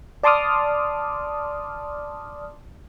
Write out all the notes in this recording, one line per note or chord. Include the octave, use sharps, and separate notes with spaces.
D5 A5 C6 D6 D#6 F6